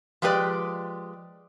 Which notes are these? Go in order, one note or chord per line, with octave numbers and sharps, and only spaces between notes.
F3 G#3 G4 B4 D5